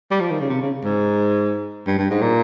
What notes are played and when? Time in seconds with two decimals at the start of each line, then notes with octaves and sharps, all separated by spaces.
0.11 G3
0.20 F3
0.30 D#3
0.40 C#3
0.50 C3
0.61 C#3
0.84 G#2
1.87 G2
1.99 G2
2.10 G#2
2.21 A#2